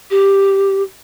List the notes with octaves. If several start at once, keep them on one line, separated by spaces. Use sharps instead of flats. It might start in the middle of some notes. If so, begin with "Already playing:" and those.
G4